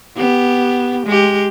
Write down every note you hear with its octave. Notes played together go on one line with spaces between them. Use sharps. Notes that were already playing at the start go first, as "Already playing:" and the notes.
B3 G4
G#3 G4